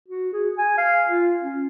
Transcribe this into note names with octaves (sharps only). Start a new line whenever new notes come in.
F#4
G#4
G#5
F5
F4
C#4